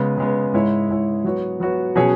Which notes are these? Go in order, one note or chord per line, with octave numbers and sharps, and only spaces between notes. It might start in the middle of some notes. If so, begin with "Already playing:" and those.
Already playing: C#3 G#3 B3
C#3 G#3 B3
G#2 G#3 E4 C#5
G#2 G#3 E4 C#5
F#3 B3 F#4 C#5
F#3 B3 F#4 C#5
B2 F#3 C#4 G#4 C#5